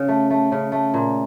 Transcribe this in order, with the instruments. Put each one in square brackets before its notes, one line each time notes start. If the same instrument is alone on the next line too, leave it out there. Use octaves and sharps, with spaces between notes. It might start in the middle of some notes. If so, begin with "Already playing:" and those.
Already playing: [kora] C#3
A3
A3
C#3
A3
A#2